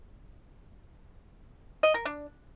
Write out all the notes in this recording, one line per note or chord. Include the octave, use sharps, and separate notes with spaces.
D#5
A#4
D4